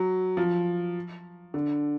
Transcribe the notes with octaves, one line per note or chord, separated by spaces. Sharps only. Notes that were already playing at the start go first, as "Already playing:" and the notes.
Already playing: F#3
F3
D3